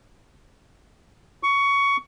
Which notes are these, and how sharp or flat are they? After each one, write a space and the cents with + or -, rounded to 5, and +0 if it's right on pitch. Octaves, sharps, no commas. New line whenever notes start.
C#6 +15